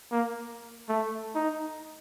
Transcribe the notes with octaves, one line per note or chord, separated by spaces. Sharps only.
A#3
A3
D#4